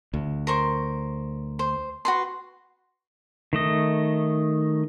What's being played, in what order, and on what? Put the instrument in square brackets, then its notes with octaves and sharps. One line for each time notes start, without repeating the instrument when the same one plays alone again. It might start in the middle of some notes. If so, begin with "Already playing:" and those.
[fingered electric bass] D2
[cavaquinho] A#4 C5 C#6
C5
F#4 B4 C6
[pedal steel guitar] D#3 A3 D#5